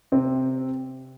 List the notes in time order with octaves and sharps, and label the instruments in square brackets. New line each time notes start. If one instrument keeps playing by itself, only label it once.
[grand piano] C3 C4